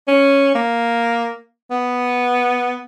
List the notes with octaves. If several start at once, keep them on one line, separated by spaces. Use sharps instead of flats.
C#4
A#3
B3